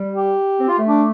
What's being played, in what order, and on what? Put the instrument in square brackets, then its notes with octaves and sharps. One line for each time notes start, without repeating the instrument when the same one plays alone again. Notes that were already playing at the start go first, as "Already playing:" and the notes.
Already playing: [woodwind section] G3
[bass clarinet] G4
[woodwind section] C4
F4
A3
[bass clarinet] D4